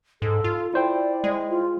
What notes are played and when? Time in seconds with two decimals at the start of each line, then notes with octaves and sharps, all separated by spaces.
0.22 G#2 A4
0.44 F4
0.74 E4 C5 D5 G5
1.24 G#3
1.50 F4